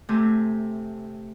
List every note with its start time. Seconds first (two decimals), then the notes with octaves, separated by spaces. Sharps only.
0.09 C3 A3 C4 G#5